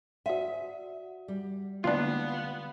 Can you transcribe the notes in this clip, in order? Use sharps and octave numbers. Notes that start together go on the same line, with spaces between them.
F#4 D5 E5 F#5
G3
D3 A#3 B3 D4 F4 F5